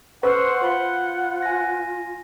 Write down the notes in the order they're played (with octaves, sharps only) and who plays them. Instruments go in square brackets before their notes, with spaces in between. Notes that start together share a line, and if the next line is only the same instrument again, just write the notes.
[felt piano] B4 [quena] C5 [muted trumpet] F#5 [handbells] C#6 E6 F6
[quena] F4 [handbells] C5 B5 C6
[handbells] G#5 A#6